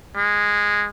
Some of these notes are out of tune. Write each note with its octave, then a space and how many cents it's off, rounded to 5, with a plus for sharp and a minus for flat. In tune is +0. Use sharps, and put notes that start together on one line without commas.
G#3 -10